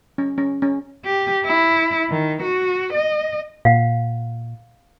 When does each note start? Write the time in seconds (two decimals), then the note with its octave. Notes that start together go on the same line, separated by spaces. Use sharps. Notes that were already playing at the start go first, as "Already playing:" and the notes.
0.18 C#4
0.38 C#4
0.62 C#4
1.05 G4
1.46 E4
2.10 D#3
2.43 F#4
2.94 D#5
3.65 A#2 F5 F#5